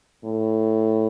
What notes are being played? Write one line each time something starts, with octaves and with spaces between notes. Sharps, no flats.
A2